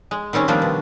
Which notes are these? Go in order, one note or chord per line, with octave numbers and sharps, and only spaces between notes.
G#3
D#3 G3 C4 C#4
D#3 F3 G3 A#3 C4 D4
B2